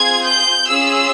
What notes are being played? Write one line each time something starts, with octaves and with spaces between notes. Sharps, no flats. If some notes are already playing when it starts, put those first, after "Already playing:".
Already playing: C4 F4 G#4 G#6
G6
C#4 F4 G#4 E6